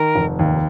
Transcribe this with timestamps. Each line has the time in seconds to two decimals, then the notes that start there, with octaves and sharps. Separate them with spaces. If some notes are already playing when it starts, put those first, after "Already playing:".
Already playing: D#3 A#4
0.16 F1
0.39 D#2